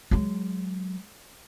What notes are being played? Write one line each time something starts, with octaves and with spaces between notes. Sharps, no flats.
F#3 G#3